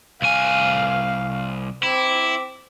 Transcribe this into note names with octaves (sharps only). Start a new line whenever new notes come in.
C2 F5 G#5
C4 E4 D6